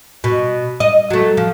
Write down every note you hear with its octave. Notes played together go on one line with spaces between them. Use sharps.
B2
D#5
F#3 A3
F3